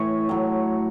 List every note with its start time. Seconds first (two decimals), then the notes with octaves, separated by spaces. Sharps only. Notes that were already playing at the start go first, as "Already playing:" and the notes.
Already playing: A2 E3 C#5
0.29 A2 F#3